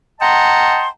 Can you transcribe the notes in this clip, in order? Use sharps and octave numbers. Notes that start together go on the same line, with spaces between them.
D#5 F#5 G5 A5 A#5 C6